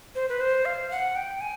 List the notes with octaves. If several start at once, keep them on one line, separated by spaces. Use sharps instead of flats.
C5
B4
C5
F5
F#5
G5
G#5